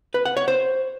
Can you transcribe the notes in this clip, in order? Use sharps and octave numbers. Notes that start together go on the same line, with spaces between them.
B4
F#5
C#5
C5